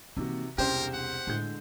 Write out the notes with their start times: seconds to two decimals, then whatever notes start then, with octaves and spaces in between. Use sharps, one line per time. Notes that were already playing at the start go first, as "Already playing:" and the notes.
0.17 C3 D#3 E3 A#3 F#4
0.58 E1 C2 C#4 D4 G4 A#4 C5
0.94 F#5
1.27 A2 D3 G#3 G6